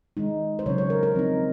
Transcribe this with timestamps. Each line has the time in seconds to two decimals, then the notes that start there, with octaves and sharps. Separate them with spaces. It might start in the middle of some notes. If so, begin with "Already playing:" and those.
0.17 D#3 G#3 D#4
0.59 C5
0.66 C#3 F#3 C#4 C#5
0.78 C#5
0.90 A#4
1.03 A#4
1.15 F3 C4 D#4